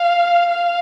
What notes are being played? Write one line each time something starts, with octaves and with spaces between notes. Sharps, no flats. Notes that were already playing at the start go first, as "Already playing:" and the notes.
Already playing: F5
F5